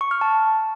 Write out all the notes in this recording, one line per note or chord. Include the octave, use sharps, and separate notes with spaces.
C#6
F6
A5